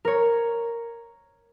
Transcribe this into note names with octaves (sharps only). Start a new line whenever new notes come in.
A#4 C#5